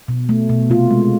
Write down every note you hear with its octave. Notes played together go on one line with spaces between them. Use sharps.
B2
A3
B2
C3 F4
G#3